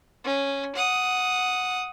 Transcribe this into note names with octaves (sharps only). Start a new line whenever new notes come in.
C#4
F#5 D#6